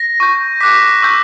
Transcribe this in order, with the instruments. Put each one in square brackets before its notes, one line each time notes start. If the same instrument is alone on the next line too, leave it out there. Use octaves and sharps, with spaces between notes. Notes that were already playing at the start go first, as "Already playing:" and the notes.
Already playing: [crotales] A#6
C#6 G6
D6 F#6 B6
C#6 E6 G6